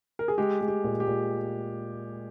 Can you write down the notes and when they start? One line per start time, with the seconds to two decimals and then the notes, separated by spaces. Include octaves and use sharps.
0.19 A#4
0.28 G#4
0.38 G#3 G4
0.61 G#3
0.68 G4
0.84 A#2
1.00 G4
1.08 A#2